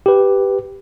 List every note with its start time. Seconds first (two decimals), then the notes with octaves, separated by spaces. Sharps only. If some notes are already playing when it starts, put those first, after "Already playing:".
0.06 G4 B4